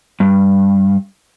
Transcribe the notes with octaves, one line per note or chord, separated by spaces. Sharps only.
G2